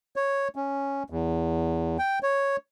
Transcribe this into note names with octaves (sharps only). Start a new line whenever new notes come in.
C#5
C#4
E2
G5
C#5